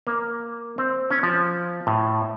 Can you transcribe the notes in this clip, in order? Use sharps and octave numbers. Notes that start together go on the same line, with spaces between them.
A#3
C4
C#4
F3
A2